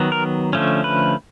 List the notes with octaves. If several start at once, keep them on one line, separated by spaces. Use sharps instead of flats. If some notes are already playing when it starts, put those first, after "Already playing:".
Already playing: D#3 F#3 B3
A#4
D3 F3 A3 C#4
B4